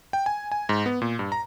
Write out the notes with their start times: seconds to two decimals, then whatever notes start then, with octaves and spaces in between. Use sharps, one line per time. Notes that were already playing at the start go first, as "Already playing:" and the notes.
0.13 G5
0.26 G#5
0.52 G#5
0.69 G#2
0.86 B3
1.02 A#2
1.19 G2
1.32 A#5